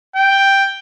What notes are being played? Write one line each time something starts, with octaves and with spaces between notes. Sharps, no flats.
G5